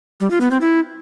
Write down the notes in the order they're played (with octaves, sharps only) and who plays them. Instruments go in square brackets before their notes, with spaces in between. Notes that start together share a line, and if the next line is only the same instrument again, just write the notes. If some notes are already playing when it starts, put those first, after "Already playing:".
[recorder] G3
F4
B3
C4
E4